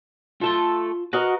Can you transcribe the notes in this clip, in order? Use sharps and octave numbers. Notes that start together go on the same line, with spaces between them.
A3 F4 A4 A5 C6
F#4 A#4 B4 D#5